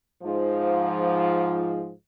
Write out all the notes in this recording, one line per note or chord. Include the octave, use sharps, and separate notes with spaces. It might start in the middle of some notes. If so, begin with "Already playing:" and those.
G#2 F3